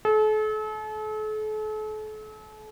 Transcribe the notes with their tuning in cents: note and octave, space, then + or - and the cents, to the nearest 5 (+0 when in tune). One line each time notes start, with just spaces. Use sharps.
A4 -40